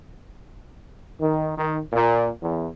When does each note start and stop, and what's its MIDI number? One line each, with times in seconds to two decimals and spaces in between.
1.20 1.53 51
1.58 1.79 51
1.92 2.29 46
2.42 2.68 40